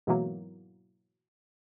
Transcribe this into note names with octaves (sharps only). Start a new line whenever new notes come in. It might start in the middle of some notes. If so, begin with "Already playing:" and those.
G#2 B2 E3 F#3 A#3